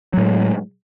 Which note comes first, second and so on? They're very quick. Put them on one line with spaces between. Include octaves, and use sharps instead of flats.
F#3 A2 G#3